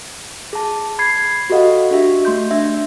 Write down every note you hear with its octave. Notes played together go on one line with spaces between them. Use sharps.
G#4 A5
B5 G#6 C7
F#4 G4 A4 D#5 F5 F#5
D4 F#4 G4 E5
A3 C6 G6
D4 E5